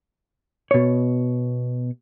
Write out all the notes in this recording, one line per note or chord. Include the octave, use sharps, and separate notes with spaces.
B2 C#5